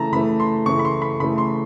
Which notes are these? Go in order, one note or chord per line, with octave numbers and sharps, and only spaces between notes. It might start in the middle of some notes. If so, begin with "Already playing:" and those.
Already playing: C#3 E3 A3 A5 A#5
C#3 E3 A3 B5
C6
C#3 E3 A3 C#6
B5
C6
B5
C#3 E3 A3 B5
C6